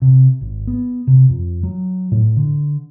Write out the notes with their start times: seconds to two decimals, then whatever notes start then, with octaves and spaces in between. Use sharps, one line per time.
0.02 C3
0.41 G#1
0.67 B3
1.07 C3
1.29 F2
1.63 F#3
2.12 A2
2.36 D3